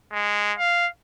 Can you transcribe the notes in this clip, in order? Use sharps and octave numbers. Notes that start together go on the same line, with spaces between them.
G#3
F5